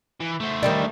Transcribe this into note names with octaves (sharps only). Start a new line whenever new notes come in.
E3
A3 C5
D#3 G3 D4